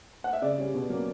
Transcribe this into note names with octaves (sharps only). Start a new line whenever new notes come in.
F#5
E5
C#3 D5
G3 C#4
B2
F#3 A#3 C#4